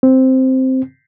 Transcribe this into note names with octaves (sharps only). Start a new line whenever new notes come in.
C4